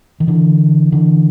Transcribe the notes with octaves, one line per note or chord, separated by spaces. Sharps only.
D#3
D3 E3
D3 E3